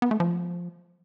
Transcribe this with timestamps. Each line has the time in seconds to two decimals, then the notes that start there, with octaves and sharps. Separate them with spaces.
0.02 B3
0.11 A3
0.20 F3